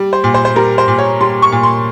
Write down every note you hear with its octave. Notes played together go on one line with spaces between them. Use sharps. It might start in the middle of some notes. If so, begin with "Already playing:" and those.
Already playing: G3
C5
A#2
C5
C5
G3 A#4
C5
A#2
C#5
G3 C6
C#6
A#2
C6